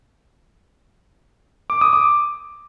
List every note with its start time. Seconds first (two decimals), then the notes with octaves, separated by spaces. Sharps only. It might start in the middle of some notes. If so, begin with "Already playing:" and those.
1.70 D6
1.81 D#6
1.93 D6